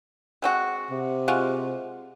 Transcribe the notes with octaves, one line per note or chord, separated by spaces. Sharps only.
G#3 C4 F#4
C3
G#3 F4 F#4